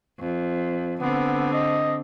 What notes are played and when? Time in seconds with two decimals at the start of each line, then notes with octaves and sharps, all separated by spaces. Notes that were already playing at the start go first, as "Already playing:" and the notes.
0.19 F2
1.01 D3 B3 C4
1.53 D#5